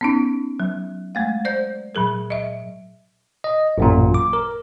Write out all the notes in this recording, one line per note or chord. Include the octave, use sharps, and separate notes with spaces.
B3 C#4 D#4
F#3
G#3 A3 F5
C5 D5 G6
A#2 F#3 G#4 A#4
D#5 E5
D#5
A1 F#2 A#2
D6
A#4